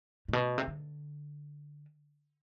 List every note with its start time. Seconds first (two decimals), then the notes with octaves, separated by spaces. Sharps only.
0.28 A2
0.33 B2
0.58 C3
0.67 D3